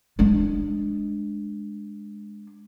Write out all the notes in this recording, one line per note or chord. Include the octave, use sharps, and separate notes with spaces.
G#3 D4